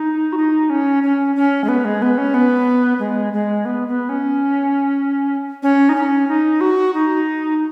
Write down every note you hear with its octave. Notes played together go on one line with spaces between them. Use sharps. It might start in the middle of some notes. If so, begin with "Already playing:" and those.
Already playing: D#4
F#4
D#4
C#4
C#4
C#4
G#3
B3
G#3
B3
C#4
B3
G#3
G#3
B3
B3
C#4
C#4
D#4
C#4
D#4
F#4
D#4